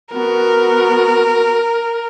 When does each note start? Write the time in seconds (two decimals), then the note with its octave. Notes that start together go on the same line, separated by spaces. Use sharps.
0.13 B3 F#4 A#4